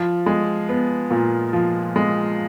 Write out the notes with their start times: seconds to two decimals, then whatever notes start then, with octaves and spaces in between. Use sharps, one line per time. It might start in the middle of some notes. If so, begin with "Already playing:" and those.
Already playing: F3
0.26 G#3
0.69 B3
1.11 A#2
1.53 F3
1.96 G#3